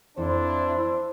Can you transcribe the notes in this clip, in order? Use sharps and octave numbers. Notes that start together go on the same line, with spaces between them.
F2 D4 E4 C5